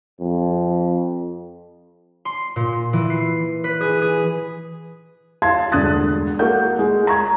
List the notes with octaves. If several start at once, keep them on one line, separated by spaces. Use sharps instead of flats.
F2
C6
A#2
E3
C7
B4
G#4
G#4
F5 A5 C6 G#6
E1 D2 G2 D#6 F#6 A6
A#3 F#4 A4 F#5 G6
G#3
A#5 C#6 G#6